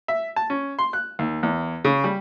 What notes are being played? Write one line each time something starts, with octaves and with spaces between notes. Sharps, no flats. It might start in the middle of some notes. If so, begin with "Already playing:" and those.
E5
A5
C#4
C6
F#6
D#2
E2
C#3
G3